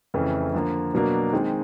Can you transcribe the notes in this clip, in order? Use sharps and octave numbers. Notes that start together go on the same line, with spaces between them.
F2 C#3 E3 A3
D3 F3 A#3
B2 F#3 A#3 D4
D#3 G#3 C4